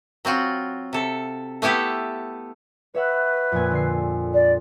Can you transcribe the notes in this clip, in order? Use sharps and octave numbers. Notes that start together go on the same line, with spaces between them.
F#3 C4 F4 F#4
C3 A4
A3 B3 E4 G4 A4
B4 C#5 E5 F#5
F2 A#2 G#5
D3 C7
D5